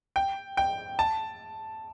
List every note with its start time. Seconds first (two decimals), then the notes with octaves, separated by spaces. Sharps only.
0.16 G5
0.57 G5
0.99 A5